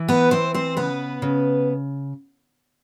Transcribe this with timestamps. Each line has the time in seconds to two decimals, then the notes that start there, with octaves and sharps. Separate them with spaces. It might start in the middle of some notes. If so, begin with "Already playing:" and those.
Already playing: E3
0.08 B3 B4
0.31 E3 C4 C5
0.54 C4 C5
0.77 C#3 B3 B4
1.22 C#3